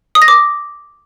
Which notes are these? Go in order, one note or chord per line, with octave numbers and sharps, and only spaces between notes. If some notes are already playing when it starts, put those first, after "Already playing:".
D#6
A#6
D6